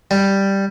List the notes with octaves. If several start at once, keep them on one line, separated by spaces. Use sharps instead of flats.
G3